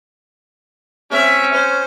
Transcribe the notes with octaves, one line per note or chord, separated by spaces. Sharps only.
C4 C#4 E5
C5